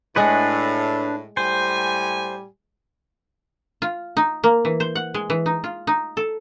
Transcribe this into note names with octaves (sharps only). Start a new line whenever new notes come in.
A2 G#3 D4 G#4 B4 F#5
A2 G3 C5 G#5
F4
D#4
A#3
E3
C5
F#5
G#3
E3
D#4
F4
D#4
A4